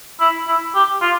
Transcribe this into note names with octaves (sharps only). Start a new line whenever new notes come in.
E4
E4
G4
F4